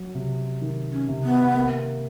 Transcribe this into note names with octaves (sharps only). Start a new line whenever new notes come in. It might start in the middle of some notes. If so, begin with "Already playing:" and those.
Already playing: F#3
C3
D#3
C#4
C3
B3
A#3